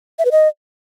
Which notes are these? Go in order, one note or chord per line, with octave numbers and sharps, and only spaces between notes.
E5
B4
D#5